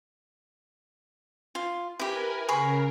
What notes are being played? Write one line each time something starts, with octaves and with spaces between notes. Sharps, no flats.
F4
E4 G4 A#4 B4 G#5
C#3 G#4 A#4 B5 C#6